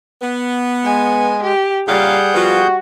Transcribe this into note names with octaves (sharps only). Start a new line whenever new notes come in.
B3
G#3 G#5
G4
A#2 C#3 G3 G#4 F5 F#5 G6
F3 B3 F4 F#4